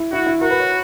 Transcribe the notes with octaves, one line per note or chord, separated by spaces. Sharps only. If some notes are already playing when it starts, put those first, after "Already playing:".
Already playing: E4
E4 F#4
E4
F#4 A#4
B4
C#5